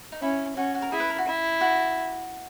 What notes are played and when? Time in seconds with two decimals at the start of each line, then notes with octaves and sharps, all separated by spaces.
0.12 D#4
0.21 C#4 E4
0.56 C#4 F#4
0.75 F#4
0.82 A#4
0.92 E4 G#4
1.00 B4
1.10 A#4
1.18 F#4
1.27 E4
1.61 F#4